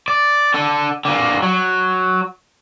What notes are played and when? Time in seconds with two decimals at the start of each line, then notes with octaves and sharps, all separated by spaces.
0.08 D5
0.54 D3 A4
1.05 D3 A#3
1.42 F#3